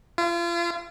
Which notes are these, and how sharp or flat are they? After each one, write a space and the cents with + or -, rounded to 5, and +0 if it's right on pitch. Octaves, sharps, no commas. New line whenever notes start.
F4 -35